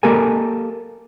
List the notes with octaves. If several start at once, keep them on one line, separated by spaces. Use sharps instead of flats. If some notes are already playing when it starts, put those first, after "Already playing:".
A#3 G4 A4 A#4 G#5